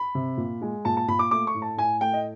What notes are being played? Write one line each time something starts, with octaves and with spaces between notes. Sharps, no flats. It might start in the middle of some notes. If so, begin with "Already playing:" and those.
Already playing: B5
C3
A#2
G#3
A#2 A5
A5
A#2 B5
D6
A3 D6
C#6
A2
A5
A2 G#5
A3 G5
D#5